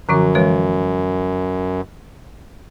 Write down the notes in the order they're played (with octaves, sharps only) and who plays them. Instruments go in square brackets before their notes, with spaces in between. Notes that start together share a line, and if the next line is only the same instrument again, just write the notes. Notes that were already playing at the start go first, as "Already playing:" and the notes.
[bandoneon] F#2 [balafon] D3 F3 F#4
[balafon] E3 G#3 C#5